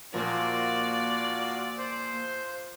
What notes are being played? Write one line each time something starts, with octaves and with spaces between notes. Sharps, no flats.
A#2 F3 A#3 F4 F#4 A#4 D5
C5